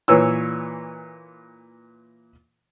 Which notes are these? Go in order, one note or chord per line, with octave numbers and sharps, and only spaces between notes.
A#2 E3 C#5 E6